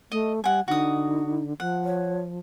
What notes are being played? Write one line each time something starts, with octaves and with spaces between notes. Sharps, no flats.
A3 D#5
G3 F#5 G#5
D3 D#4 F#4 D#6
F3 F#5
C#5